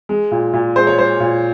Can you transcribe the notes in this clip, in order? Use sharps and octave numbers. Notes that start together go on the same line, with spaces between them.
G#3
A#2
A#2
G#3 C5
C#5
G#3 C5
A#2